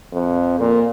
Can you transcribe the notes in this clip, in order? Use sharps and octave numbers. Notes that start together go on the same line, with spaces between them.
F2
A#2